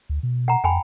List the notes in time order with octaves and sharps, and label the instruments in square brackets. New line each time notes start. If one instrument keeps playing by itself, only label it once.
[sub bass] D2
B2
[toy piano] F#5 A#5
[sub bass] F2 [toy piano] G5 G#5 B5